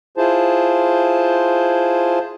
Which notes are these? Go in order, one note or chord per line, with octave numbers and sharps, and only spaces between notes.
E4 F4 G#4 C5 A5